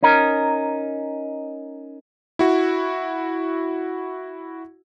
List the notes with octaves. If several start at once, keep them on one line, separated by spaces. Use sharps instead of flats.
C#4 D#4 A#4
E4 F#4